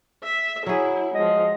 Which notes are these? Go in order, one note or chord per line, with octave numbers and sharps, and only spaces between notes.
E5
F#3 E4 G#4
F3 G#3 D#5